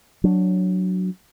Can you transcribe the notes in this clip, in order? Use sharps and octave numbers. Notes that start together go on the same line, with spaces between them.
F#3 D4